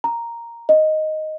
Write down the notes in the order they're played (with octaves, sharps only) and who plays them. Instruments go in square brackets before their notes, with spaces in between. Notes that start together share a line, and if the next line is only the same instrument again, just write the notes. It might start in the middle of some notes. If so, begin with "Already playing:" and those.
[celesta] A#5
D#5